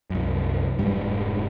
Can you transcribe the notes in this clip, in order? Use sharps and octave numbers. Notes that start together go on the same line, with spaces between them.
C2 F#2
F1 C#2 G#2 G3